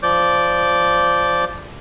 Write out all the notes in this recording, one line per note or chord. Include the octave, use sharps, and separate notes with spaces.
F3 D5 D6 G6